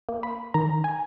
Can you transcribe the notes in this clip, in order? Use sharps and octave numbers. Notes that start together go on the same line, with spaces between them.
A#3
B5
D#3 A#5
G#5